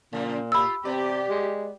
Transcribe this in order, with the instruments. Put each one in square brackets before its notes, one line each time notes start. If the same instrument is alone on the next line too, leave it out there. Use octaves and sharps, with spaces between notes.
[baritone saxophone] A#2 [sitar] C#3 F3 A#3
[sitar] F4 G4 [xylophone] B5 E6
[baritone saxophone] C3 [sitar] B3 D5 [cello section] G4
[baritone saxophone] G#3